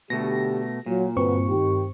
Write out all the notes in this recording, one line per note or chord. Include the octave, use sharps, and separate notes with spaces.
B2 D3 A3 G4 A#6
A#2 F#3 F4
G2 D3 C4 F#4 B4 C#6
D#3 G4